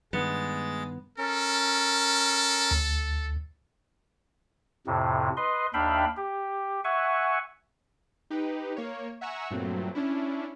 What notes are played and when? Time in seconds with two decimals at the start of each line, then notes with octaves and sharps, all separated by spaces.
0.13 G2 D#3 G#3 B3 A6
1.18 C#4 A4 A#4
2.71 D2
4.87 F2 A2 C3
5.37 B4 D#5 C6
5.74 D#2 D4 E5 F5 G5 B5
6.17 G4
6.84 E5 F#5 G#5 C#6
8.30 D#4 G4 B4
8.76 A#3 C#5
9.21 E5 F#5 G#5 A#5 C#6 E6
9.51 G2 A#2 F#3 A3 C4
9.95 C#4 D4 E4